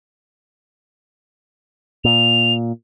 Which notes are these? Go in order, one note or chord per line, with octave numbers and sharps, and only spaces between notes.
A#2 F7